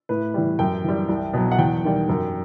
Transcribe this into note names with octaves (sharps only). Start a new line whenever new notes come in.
A2 B4
E3 G3
F#2 G5
E3 G3
C2
B2 F#3
F#5
E2 G5
D#3 G3
F#2